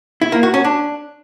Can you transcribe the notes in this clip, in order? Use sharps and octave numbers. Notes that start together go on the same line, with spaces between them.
E4
A#3
F#4
C#4
D4